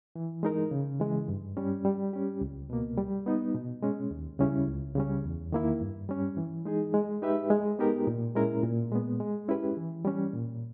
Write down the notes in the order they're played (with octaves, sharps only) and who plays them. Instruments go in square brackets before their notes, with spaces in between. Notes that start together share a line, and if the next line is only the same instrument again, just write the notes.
[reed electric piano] E3
G#3 D#4 A#4
C#3
E3 G#3
G2
G3 C#4
G3
C#4 G4
C#2
B2 A#3
G3
B3 D#4
B2
G#3 C#4
D#2
C#3 G3 C#4 E4
C#2
C#3 G3 C#4
E2
D#3 A#3 E4
G2
G3 C#4
E3
G#3 D#4 G#4
G#3
D#4 G4 B4 E5
G#3
B3 D#4 G4 A#4
A#2
G#3 C#4 E4 A#4
A#2
G#3 B3
G#3
C#4 E4 G4 B4
E3
G3 C#4
A#2